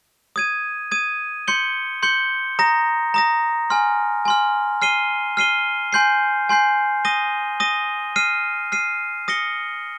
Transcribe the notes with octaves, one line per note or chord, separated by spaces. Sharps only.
D#6 G#6 D#7
D#6 G#6 D#7
C6 G6 C#7 G7
C6 G6 C#7 G7
A#5 D#6 A#6
A#5 D#6 A#6
G#5 C6 F6
G#5 C6 F6
F6 C7 D#7 G7
F6 C7 D#7 G7
G#5 C6 G6 C7
G#5 C6 G6 C7
D#6 A#6 D#7 G7
D#6 A#6 D#7 G7
F6 C7 D#7
F6 C7 D#7
D#6 A#6 C#7 G7